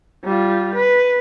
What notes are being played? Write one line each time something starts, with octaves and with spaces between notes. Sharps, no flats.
G3 F4
B4